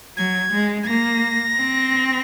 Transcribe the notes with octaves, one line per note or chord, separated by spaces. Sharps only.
F#3 G#6
G#3
G#6
A#3 A#6
C4